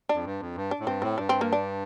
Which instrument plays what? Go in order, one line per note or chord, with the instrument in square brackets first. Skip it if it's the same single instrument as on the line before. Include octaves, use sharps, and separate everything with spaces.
[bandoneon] F2 [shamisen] D4
[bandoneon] G2
F2
G2
[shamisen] D4
[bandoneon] A2
[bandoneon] G2 [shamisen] C4
[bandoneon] A2 [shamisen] C4
[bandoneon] G2 [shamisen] D4
[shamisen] C4
A#3
D4